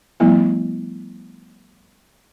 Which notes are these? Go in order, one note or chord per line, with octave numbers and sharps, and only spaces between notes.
F3 G3 A3 B3 E4 F4